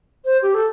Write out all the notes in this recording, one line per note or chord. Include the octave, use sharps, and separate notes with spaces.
C5
G4
A4